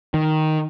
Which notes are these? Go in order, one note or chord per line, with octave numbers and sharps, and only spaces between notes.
D#3